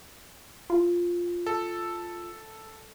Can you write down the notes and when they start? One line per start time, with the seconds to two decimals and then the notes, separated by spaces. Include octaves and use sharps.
0.70 F4
1.46 A4